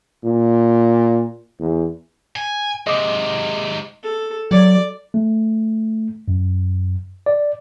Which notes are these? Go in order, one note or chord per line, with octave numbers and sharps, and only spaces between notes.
A#2
E2
G#5
G#2 C3 D#5 D6
A4
F#3 D5
A3
F#2
D5